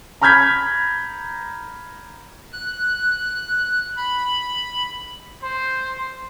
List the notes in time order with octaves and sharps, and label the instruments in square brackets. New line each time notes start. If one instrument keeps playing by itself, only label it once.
[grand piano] A#5 B5 F6 G6 G#6 B6
[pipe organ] F#6
B5
[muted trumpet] C5 [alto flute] C6